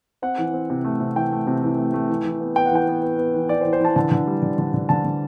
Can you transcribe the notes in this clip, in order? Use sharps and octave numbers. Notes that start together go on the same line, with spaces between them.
C4 F#5
E3
C4
C3
A3
C3
E3 G5
A3
C3
E3
A3
A3
E3
E3
B3
B3 G5
F#5
E3 G5
B3
B3
B3
E3
E3 D5
C5
E3
C5
E3 A5
D3 A5
D3
G3
D3
D3
D3
D3 A5
D3